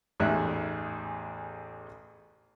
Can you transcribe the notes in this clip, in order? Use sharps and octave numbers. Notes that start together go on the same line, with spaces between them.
A1 E2 D#4 G#4 E5 F#6